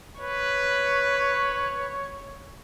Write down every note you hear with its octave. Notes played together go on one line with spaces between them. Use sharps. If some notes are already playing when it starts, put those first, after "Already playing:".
B4 C#5